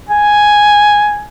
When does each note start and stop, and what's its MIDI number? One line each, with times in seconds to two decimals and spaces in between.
0.09 1.24 80